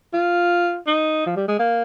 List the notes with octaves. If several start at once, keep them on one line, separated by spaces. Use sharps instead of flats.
F4
D#4
F3
G3
G#3
A#3